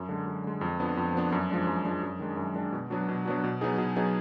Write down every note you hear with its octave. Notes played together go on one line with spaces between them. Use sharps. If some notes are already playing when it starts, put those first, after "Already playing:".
Already playing: F#2
D3 G#3
F#2
D3 G#3
F2
F3 B3 D4
F2
F3 B3 D4
F#2
F3 G#3 D4
F#2
F3 G#3 D4
F#2
D#3 G#3 D4
F#2
D#3 G#3 D4
B2
F#3 B3 D4 F#4
B2
F#3 B3 D4 F#4
B2
F#3 B3 D#4 G#4
B2
F#3 B3 D#4 G#4